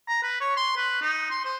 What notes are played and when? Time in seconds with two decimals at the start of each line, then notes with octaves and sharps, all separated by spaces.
0.08 A#5
0.23 B4
0.40 C#5
0.56 C6
0.77 B4
1.02 D#4
1.30 C6
1.44 C5